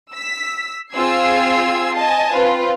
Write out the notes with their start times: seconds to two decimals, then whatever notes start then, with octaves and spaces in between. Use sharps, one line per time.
0.12 E6 B6
0.93 C4 F4 G#4 E6 G#6 C7
1.94 D#5 G#5 A5
2.33 C4 F4 B4